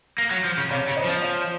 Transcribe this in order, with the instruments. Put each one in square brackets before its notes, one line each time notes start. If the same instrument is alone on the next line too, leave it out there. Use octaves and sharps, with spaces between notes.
[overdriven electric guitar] A#3
F#3
F3
C#3
[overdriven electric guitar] C3 [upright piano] C#5 F5
[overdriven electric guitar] C#3
[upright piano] C5 D#5
[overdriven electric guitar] F3
[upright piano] D#5
C#5 F5